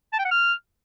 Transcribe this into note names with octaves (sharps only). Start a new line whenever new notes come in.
A5
G5
F#5
F6